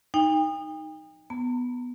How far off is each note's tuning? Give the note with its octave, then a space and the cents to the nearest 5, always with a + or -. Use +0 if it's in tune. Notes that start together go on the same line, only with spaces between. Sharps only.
D#4 +0 G5 +40
B3 +0 A#5 -45